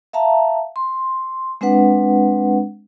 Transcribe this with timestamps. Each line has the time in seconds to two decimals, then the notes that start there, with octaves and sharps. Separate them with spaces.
0.13 E5 F5 A5 A#5
0.76 C6
1.61 G#3 C4 D4 B4 F#5